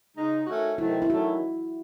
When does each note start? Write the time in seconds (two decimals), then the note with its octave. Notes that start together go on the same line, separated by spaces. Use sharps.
0.16 C#3 G#3 D#4
0.47 D#3 A3 C#4 F#4
0.78 C3 D#3 F#3 A3 C4 E4
1.02 E4
1.09 D#3 F#3 A3 C#4 F#4